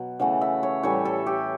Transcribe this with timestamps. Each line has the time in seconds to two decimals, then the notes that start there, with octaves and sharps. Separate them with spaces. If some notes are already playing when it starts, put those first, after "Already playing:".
Already playing: B2 F#3
0.20 C#3 E3 A3 F#5
0.41 E5
0.63 C#5
0.83 A2 E3 G3 C#5
1.05 A4
1.27 G4